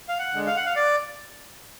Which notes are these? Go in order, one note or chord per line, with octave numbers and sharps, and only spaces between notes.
F5
F#5
D3 G#3
F5
F#5
F5
D5